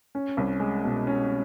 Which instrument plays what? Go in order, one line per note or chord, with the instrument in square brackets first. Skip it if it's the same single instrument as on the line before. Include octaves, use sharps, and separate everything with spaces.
[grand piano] C#4
C2
G#3
B2
C#4